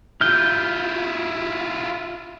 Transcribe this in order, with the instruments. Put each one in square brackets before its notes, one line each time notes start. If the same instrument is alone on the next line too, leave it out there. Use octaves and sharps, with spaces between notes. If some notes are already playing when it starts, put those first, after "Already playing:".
[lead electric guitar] E4 F4 [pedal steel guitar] F6 G6